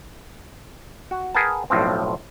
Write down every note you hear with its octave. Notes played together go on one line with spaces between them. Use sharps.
F#4
G#4 A#4 B4 F#5 G5 A5
B1 A2 F3 C4